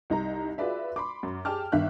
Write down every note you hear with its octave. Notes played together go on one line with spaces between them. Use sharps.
C2 D#4 A#5
F4 F#4 G#4 B4 D5 E5
B5 C6 D6
F#2
G4 G#4 G5 A5 D6 F6
G1 D#3 E5 F5 F#6